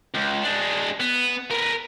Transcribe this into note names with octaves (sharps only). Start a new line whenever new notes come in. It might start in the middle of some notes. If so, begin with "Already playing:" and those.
C#2
G#3 D4
B3
A#4 B4